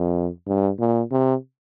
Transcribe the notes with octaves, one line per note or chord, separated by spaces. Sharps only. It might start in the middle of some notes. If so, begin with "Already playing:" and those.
Already playing: F2
G2
A#2
C3